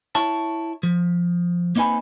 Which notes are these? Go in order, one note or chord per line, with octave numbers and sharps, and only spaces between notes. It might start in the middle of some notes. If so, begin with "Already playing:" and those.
E4 C#5 A5
F3
A#3 C4 D#4 B4 G#5 B5